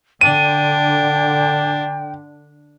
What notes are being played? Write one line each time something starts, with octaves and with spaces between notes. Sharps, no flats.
D3 D4 G5 D#7